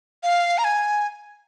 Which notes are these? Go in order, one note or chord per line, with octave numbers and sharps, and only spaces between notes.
F5
A#5
G#5